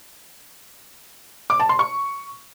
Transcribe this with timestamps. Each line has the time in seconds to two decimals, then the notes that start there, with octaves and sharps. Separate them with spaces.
1.50 D6
1.60 A5
1.69 C6
1.79 C#6